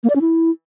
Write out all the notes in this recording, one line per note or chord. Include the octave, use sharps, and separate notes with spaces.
A#3
D5
C#4
E4